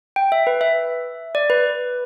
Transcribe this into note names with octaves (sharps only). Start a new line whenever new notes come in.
G5
E5
B4
E5
D5
B4